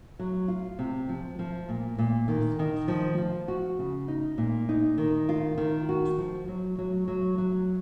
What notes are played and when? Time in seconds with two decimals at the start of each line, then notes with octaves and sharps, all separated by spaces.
0.19 F#3
0.48 F4
0.79 C3
1.09 F3
1.39 F3
1.69 A#2
1.98 A#2
2.28 D#3
2.59 D#3
2.88 F3
3.18 F3
3.48 F#4
3.79 C#3
4.08 D#4
4.38 A#2
4.69 D#4
4.98 D#3
5.29 F4
5.58 D#3
5.89 F#4
6.18 F3
6.48 F#3
6.79 F#3
7.08 F#3
7.38 F#3